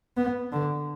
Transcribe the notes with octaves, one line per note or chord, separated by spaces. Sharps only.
B3
D3